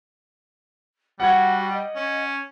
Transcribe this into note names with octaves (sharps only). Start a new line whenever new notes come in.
G3 F#4 F#5 G#6
D#5
C#4